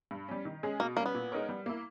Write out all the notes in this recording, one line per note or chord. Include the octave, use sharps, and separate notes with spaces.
G2
G3 C#4
D#3
G#3 C#4 G#4
B2 A#3
G3 A#3 C#4
B3
A#2
G#3 D#4 A#4 C#5
G3
A#3 E4